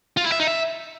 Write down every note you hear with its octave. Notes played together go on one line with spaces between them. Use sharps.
F4
E4
E5
D#4
E5